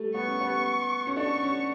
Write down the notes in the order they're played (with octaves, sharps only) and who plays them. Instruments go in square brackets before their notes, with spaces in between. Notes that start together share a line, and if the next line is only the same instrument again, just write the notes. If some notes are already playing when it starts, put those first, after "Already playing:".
Already playing: [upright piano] G3 A3
[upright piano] B3 [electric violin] C#6
[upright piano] C#4
B3
C#4
[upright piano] D4 [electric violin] C#6
[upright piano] C#4